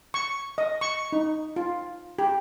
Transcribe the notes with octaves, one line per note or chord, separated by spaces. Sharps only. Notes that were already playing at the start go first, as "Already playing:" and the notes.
C#6
D#5
C#6
D#4
F4
G4